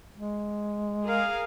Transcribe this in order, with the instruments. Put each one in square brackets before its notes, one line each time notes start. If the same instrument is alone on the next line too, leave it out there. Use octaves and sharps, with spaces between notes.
[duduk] G#3
[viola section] G#4 A#4 F5